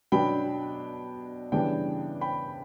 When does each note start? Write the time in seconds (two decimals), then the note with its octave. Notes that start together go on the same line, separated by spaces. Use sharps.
0.12 B2 F#3 B3 D4 G5 B5
1.52 C#3 E3 G3 B3 D4 G5
2.21 G5 B5